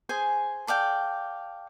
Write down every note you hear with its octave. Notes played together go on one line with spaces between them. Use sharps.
G#4 C5 G#5
A4 D5 F5 G5